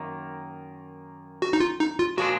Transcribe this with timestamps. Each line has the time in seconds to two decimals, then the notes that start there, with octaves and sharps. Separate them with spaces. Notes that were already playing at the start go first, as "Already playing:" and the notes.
Already playing: F#2 D#3 A#3
1.42 F#4
1.53 D#4
1.60 F4
1.80 D#4
1.99 F4
2.17 A#2 F3 G#3 D4 F#4